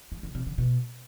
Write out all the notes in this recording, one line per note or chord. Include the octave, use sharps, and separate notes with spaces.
G#3
C#3
C3
D3
B2